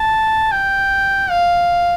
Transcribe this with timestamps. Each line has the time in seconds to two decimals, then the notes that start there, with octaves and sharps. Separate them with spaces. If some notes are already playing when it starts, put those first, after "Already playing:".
Already playing: A5
0.52 G5
1.30 F5